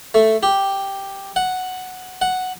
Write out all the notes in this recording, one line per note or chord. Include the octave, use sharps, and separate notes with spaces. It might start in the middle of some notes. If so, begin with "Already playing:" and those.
A3
G4
F#5
F#5